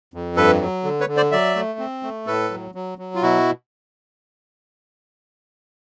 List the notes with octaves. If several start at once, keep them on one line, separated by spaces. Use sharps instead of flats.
F2
G2 A4 B4
F#3
D3
B4 C#5
D3
C5 D5
F#3 D5 E5
A3
C4
A3
A2 A4 B4
F#3
F#3
F#3
F4
B2 E4 F#4